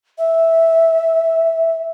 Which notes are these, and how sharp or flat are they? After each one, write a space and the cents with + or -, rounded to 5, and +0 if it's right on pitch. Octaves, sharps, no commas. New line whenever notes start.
E5 -10